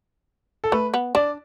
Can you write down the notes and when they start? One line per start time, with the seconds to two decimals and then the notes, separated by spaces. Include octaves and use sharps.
0.64 A4
0.72 A3 B4
0.94 B3
1.15 D4 D5